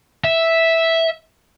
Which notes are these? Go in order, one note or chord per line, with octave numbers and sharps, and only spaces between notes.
E5